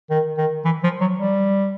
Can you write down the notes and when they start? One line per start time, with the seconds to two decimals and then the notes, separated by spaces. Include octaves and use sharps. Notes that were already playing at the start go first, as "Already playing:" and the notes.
0.10 D#3
0.38 D#3
0.65 E3
0.83 F3
1.01 F#3
1.19 G3